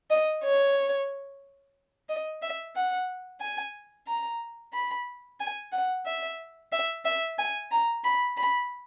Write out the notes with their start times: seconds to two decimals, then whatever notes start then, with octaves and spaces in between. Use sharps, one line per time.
0.10 D#5
0.43 C#5
2.09 D#5
2.42 E5
2.75 F#5
3.40 G#5
4.07 A#5
4.73 B5
5.40 G#5
5.72 F#5
6.06 E5
6.72 E5
7.05 E5
7.38 G#5
7.71 A#5
8.04 B5
8.37 B5